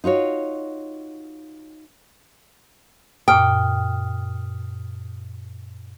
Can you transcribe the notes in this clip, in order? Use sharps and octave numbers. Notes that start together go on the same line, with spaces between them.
D#4 F4 F#4 C#5
F#2 A#2 G5 D#6 F6